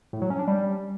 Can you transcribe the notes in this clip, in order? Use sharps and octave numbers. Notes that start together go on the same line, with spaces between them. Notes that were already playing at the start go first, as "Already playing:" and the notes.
A2
F#3
C#4
D4
G3